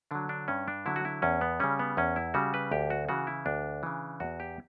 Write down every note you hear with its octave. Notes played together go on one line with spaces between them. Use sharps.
D3 F#3 D4
D4
G2 C#4
D4
D3 F#3 E4
F#4
E4
E2 C#4
B3
C#3 G3 C#4
B3
E2 C#4
E4
C#3 G3 F#4
B4
D2 G4
F#4
C#3 E3 F#4
E4
D2 D4
C#3 E3
E2 F#4
G4